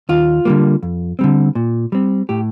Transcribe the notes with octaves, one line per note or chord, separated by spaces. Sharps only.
D#2 F4
D3 G3 A#3
F2
D3 G3 C4
A#2
G3 C4
A2 G4